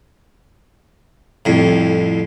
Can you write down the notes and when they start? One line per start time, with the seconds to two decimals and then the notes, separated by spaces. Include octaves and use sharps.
1.45 C2 F2 A2